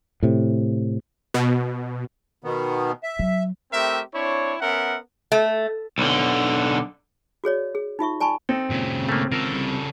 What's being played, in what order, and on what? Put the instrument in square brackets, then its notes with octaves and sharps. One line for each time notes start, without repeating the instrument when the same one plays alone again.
[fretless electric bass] A2 C3
[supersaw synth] B2
[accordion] B2 D#3 B3
E5
[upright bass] F#3
[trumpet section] A3 C4 G4 A#4 E5
C4 D4 E4 C#5
B3 C#4 A#4 E5 F#5
[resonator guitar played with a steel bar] A3
[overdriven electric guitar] B1 D3
[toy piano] F#4 G#4 C#5 D5
G#4
D#4 F4 E5 C#6
D5 G#5 A5 B5 C#6
[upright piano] C4 [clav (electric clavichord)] D#4 A4
[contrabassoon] G#1 [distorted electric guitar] A#2 C#3
[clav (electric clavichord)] A3 A#3
[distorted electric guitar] C#3 A4 [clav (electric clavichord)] F4 A#4
[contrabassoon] C2